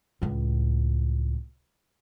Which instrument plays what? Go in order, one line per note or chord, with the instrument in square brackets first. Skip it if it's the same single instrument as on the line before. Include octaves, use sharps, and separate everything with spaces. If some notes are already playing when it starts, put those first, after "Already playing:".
[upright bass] C#2 A2